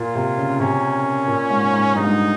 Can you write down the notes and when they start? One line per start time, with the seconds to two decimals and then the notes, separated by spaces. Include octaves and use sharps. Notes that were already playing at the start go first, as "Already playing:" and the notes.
Already playing: A#2 F4
0.15 C3
0.37 C#3
0.60 C3 C#4
1.28 A#2
1.50 G#2
1.73 G#2
1.95 G2 D#4
2.04 G#2